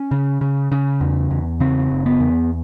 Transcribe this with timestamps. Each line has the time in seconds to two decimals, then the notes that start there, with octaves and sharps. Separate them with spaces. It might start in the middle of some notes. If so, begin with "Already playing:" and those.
Already playing: C#4
0.11 C#3
0.41 C#3
0.72 C#3
1.01 E2
1.31 E2
1.60 C#3 C4
1.90 F#1
2.06 B3
2.20 E2